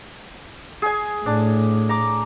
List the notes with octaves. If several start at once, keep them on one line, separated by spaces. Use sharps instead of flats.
G#4 G#5
A2 D4
A#5 D6